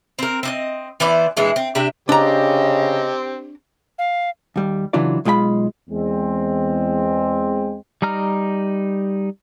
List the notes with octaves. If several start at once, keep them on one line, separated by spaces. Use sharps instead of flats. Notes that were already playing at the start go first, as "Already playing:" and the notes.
C4 A#4
C4 D4 D#5
E3 B3 C5 D5
A#2 E3 G#3 D4
C4
C3 D4 G4 E5
C#3 C4 D4 G4 D#5 A#5
F5
D#2 G3
C#3 E3 F#3 D4 F4 D5
B1 G#3 F4 G5 B5
E2 G#3 C4
G3 D#4 A#5 F6